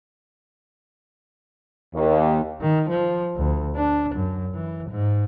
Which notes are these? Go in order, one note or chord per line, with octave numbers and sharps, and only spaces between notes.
D#2
D#3
F3
D2
D4
F#2
E3
G#2